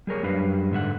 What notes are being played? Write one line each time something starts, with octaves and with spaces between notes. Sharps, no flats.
G3 G#4 A#4 C#5
F#2 G3 D4 B4 F5
G#2 D3 E5 F#5